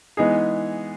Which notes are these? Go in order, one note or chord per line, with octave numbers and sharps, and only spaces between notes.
E3 G#3 B3 D#4 G#4